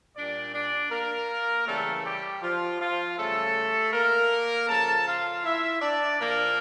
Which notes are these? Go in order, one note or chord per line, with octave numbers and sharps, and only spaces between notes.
A#2 G3 D4 D5
D4 D5
A#3 A#4
C#3 E3 G3 A3 A4
G3 G4
F3 F4
F3 F4
C#3 G3 A3 A4
A#3 A#4
C#3 F3 A4 A5
F4 F5
E4 E5
D4 D5
A#2 F3 A#3 A#4